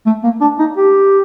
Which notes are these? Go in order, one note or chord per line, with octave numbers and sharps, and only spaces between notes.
A3
A#3
D4
D#4
G4